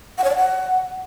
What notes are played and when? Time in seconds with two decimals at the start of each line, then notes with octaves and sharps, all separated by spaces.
0.18 F#5
0.24 C#5
0.30 D5
0.36 F#5